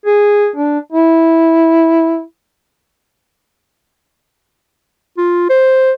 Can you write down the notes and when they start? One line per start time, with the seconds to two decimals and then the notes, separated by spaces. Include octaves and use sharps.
0.06 G#4
0.56 D4
0.92 E4
5.18 F4
5.49 C5